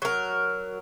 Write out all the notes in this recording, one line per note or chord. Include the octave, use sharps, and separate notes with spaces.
F#3 A#4